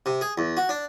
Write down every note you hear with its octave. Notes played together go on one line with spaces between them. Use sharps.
C3
G#4
E2
F#4
D4